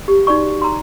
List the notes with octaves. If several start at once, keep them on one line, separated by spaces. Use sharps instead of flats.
G4
D#4 F#4 D5 C#6
A#5 C6